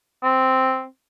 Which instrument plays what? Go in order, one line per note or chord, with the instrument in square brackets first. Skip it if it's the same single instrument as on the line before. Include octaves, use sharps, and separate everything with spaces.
[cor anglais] C4